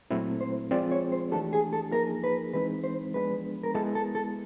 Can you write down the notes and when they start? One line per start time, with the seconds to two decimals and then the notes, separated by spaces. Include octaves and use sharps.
0.11 A#2 F#3 A3 C4 E4
0.41 C5
0.71 F3 G#3 C4 F4 G#4 D5
0.92 C#5
1.12 C5
1.32 E3 A3 D4 G4 A4
1.53 G#4
1.73 A4
1.92 F3 A#3 D#4 G#4 A#4
2.24 B4
2.54 E3 G#3 C4 D#4 B4
2.84 C5
3.14 F3 G#3 B3 D4 B4
3.63 A#4
3.75 G#3 B3 E4 A4
3.95 A4
4.15 A4